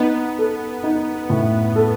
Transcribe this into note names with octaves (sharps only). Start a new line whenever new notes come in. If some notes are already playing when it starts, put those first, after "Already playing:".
Already playing: B3 D#4
A4
D#4
A2
A4